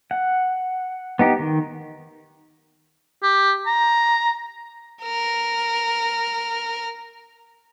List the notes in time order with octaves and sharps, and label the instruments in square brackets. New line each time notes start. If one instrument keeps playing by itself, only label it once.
[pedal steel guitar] F#5
B3 D#4 G4
D#3
[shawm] G4
A#5
[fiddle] A#4 F6